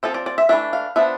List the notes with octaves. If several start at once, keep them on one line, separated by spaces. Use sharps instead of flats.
F3 C4 A4
D5
D5
E5
E3 A3 D4 E5
F5
F3 B3 D4 E5